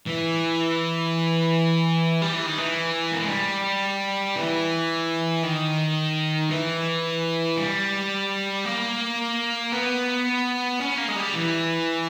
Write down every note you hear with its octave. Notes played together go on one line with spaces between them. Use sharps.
E3
G3
E3
D#3
E3
A#3
G#3
G3
E3
D#3
E3
G3
A#3
B3
C#4
A#3
G#3
G3
E3